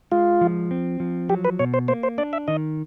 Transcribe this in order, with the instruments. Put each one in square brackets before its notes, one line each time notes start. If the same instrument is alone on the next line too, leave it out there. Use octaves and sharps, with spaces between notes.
[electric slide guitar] G#3 [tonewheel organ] F4
[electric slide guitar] F3
C4
F3
[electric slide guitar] F#3 [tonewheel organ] G4
[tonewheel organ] B4
[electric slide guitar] B2 [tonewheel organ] C#5
[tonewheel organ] C5
[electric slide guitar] A#3 [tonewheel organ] C5
[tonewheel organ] C5
[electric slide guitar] D4 [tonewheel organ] D5
[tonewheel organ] E5
[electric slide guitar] D#3 [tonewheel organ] D#5